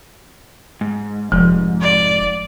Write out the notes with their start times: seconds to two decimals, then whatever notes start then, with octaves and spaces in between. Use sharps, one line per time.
0.81 G#2
1.32 F1 G#2 F3
1.82 D5